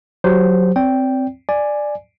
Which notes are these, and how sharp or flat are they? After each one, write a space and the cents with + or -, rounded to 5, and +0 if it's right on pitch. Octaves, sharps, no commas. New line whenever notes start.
F#3 +0 G4 +0 C5 -15
C4 +0 D5 -35 G5 +0
D5 +10 G#5 +0